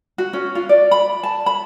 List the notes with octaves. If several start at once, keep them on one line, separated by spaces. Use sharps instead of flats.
F#4
C#4
F4
D5
B5
A5
B5